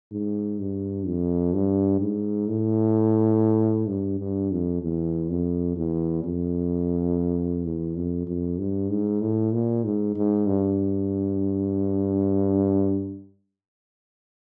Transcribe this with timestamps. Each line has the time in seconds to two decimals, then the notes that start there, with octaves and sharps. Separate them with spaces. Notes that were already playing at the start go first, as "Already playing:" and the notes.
0.12 G#2
0.59 G2
1.06 F2
1.53 G2
2.01 G#2
2.48 A2
3.88 G2
4.19 G2
4.51 F2
4.82 E2
5.30 F2
5.76 E2
6.24 F2
7.65 E2
7.96 F2
8.27 F2
8.59 G2
8.90 G#2
9.21 A2
9.53 A#2
9.84 G#2
10.16 G#2
10.47 G2